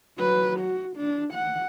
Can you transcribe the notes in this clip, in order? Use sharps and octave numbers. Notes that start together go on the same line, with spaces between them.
F#3 B4
F#4
D4
F#5